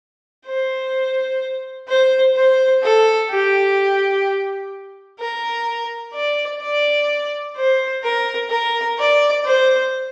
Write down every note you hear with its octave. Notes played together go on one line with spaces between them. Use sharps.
C5
C5
C5
A4
G4
A#4
D5
D5
C5
A#4
A#4
D5
C5